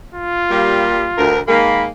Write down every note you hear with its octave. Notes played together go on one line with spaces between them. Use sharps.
F4
G3 A#3
D2 A#4
D#3 G#3 A#3 B5